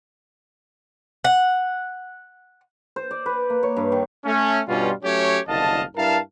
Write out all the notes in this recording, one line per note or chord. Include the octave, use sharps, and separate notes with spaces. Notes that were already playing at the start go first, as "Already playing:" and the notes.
F#5
C5
D5
B4
A#3
C#5
G2
D#3
A3 C#4
G2 B2 G3 C#4 F4
F#3 A3 C#4 G4 C#5
F#1 C2 D3 D#5 F5 A5
G2 E4 A#4 F5 A5